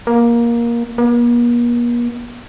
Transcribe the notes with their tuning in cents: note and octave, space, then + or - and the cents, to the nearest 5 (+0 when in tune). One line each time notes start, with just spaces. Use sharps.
A#3 +15
A#3 +45